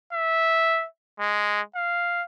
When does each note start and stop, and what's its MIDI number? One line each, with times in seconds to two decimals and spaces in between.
0.13 0.86 76
1.20 1.61 56
1.75 2.23 77